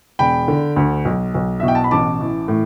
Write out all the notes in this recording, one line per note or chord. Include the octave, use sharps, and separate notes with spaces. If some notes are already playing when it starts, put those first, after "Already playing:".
E1 G5 B5
D3
D2
B1
B1
E5
B2
G5
A5
B5
A1 A5 D6
E3
A2